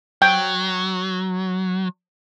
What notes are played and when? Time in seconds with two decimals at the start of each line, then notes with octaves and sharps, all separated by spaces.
0.22 F#3 G5